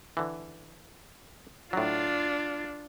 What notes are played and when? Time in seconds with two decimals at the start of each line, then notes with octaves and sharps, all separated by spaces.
0.17 D3 E3
1.73 A2 F#3 D4 F4